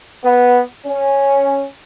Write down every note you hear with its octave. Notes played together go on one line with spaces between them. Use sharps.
B3
C#4